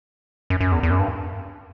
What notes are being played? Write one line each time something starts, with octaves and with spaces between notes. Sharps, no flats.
F#2
F#2
E2
E2
F#2
G2